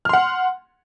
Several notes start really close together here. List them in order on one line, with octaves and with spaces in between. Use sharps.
F6 C6 F#5